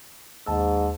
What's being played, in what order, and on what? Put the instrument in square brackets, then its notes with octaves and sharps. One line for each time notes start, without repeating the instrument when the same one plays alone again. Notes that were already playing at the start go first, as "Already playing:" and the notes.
[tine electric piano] D#2 A5 E6 [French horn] G#2